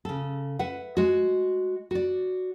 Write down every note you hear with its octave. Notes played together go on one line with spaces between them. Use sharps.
C#3 A4
B4 E5 F#5
G#3 F#4
F#4 D5